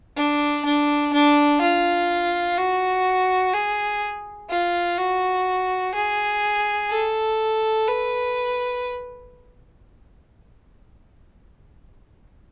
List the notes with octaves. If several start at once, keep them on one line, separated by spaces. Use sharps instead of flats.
D4
D4
D4
F4
F#4
G#4
F4
F#4
G#4
A4
B4